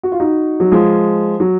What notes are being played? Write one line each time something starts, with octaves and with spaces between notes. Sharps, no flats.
F#4
F4
D#4 F#4
F#3
F3 G#3
F#3